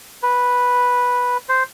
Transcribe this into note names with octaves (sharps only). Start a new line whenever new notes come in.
B4
C5